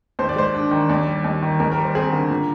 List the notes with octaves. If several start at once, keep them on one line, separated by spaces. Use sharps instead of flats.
D#2 C5
D5
G#3 C5
D4
D#3
D#2 D5
G3
D#2
D#3
D#2 A#4
A#4
G3
C5
C4 G#4
D3 A#4
A#2